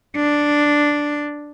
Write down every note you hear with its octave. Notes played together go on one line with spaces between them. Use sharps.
D4